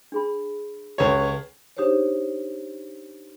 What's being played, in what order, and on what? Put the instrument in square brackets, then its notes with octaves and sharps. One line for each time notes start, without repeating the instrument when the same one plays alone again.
[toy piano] D4 G#4 B5
[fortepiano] C#2 C#5 [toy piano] G4 A4 B4
[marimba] D4 D#4 G4 G#4 C5 C#5